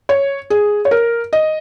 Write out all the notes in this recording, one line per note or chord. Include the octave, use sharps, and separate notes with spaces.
C#5
G#4
C#5
A#4
D#5